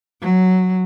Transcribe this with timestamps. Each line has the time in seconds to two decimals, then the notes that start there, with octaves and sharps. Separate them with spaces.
0.22 F#3